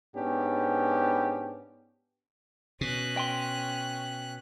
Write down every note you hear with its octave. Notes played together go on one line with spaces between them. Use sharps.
G#2 B3 C#4 D4 G4
B2 C#4 F#6
G5 C6